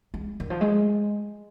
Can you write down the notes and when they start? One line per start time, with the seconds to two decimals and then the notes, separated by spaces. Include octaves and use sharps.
0.14 G#3
0.40 D#3
0.50 F3
0.61 G#3